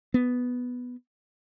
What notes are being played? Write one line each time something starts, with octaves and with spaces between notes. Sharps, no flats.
B3